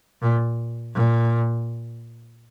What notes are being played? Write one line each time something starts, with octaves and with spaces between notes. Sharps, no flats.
A#2
A#2